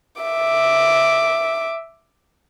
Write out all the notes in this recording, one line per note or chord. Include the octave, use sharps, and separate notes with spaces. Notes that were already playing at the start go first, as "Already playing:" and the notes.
E5 D6